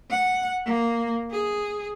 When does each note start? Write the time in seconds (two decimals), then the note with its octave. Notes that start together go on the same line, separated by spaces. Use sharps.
0.11 F#5
0.66 A#3
1.32 G#4